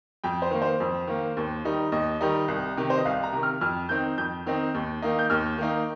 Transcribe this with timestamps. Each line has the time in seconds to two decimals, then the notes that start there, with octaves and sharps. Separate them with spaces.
0.24 F2 G5
0.42 C5
0.51 D#3 A#3
0.62 C5
0.80 F2
1.07 D#3 A#3
1.37 D#2
1.65 D#3 G3 D#4
1.92 D#2 D#5
2.21 D#3 G3 D#4
2.48 C2
2.77 C3 D#3
2.90 C5
2.97 D#5
3.05 C2 F5
3.23 A#5
3.33 C3 D#3
3.43 F6
3.61 F2 F6
3.89 D#3 C4 D#4 G6
4.18 F2 G6
4.46 D#3 C4 D#4
4.74 D#2
5.02 D#3 A#3 D#4
5.19 G6
5.30 D#2 F6
5.58 D#3 A#3 D#4